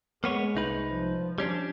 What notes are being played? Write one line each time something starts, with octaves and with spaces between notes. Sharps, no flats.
G#3 A#3 B3 C#5
C2 D#4 B4
F3
G3 C#4 D4